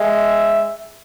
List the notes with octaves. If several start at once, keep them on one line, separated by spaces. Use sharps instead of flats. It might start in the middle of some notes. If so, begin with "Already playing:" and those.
Already playing: G#3 E5